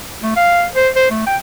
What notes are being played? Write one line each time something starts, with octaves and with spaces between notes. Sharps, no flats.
A3
F5
C5
C5
A3
G5